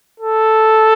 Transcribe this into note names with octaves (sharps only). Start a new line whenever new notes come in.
A4